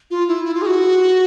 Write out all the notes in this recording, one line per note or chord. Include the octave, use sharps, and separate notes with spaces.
F4
E4
E4
F4
G#4
F#4